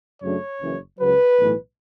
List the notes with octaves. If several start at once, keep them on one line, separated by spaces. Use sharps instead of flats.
F#2 C#3 F#3 A3 D4 C#5
F#1 F#2 C#3 E3
C#2 C#3 F#3 B4
B1 A2 E3 A3